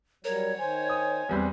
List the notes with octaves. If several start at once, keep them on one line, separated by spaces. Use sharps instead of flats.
F#3 G3 A#4 C#5
D#3 C5 G#5
D#6
E2 G3 C4 B4